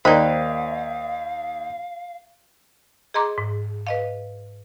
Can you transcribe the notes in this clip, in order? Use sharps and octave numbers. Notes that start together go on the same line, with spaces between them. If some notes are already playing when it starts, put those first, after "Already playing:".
D#2 D#4 A#4 C5 D5 F5 G5 B5
G#4 D#5 A#5 C6 D6
G#2
B4 D#5 F5